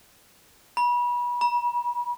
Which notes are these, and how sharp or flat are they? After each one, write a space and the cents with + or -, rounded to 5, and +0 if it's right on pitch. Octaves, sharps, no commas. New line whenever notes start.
B5 -30
B5 -45